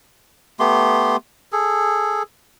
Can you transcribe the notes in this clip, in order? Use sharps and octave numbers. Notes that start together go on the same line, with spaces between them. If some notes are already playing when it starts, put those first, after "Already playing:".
A3 B3 G4 C6
G#4 A4